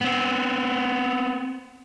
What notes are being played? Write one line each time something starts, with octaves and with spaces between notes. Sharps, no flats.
B3 C4